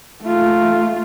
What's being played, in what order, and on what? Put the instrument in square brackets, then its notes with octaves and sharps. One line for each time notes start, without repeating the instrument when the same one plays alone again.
[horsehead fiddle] A3 F4